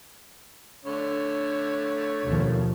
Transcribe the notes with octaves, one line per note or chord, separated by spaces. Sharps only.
D3 A3 C#5
D#2 B2 F3